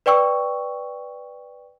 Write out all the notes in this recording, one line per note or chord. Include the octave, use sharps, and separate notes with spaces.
B4 D5 G5 C#6 E6